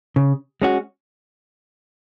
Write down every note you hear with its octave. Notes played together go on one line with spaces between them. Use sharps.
C#3
G#3 C#4 F#4